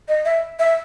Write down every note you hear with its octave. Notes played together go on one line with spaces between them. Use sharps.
D#5
E5
E5